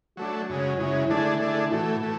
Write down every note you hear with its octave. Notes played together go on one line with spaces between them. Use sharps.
F#3 A3 D4 F#4
F#2 C#3 G#3
F#2 C#3 G#3 E4
D3 A3 D4 E4 G#4
D3 A3 D4 G#4
A2 E3 A3 F#4
A2 E3 A3